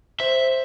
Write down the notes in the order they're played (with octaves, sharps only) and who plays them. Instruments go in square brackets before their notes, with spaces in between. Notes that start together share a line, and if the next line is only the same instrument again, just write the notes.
[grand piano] C5 [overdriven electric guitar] E5